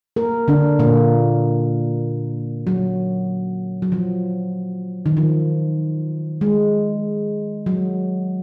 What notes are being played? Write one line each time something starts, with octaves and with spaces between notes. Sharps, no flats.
A#3 A#4
D3 D4
A#2 A#3
F#3
F#3
F3
D#3
F3
G#3
F#3